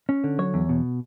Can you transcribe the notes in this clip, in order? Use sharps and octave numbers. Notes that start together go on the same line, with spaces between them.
C#4
D3
F#3 C#5
E2
B2